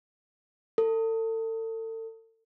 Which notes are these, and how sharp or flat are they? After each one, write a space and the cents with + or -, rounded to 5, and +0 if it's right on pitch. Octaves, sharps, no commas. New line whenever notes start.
A4 +35